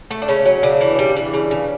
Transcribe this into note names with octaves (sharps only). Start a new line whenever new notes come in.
A3
D4
C#3 C#4
F#3
C#3 D4
E3
G3
E3
C#3
C#3